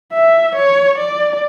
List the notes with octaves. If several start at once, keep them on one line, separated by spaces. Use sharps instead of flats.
E5
C#5
D5